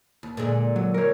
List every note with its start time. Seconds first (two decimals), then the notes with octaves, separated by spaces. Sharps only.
0.23 D#2
0.37 A#2 D3 G#3
0.76 F#3
0.94 A#4 C#5